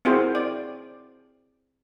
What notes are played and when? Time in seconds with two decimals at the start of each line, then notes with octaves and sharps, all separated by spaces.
0.05 C4 E4 F#4 G#4 A#4 C5
0.35 D5